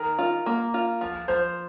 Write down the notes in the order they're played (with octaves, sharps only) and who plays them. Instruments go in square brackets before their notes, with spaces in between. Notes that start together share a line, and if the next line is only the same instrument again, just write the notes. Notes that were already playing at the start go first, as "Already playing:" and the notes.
Already playing: [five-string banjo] D#3 [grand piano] A#4
[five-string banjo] F4
A#3
F4
F3
[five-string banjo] F3 [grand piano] C5